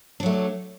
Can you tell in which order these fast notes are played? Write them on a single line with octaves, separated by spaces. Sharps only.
D4 F#3 A3